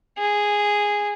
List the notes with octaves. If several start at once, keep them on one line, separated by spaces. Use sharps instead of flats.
G#4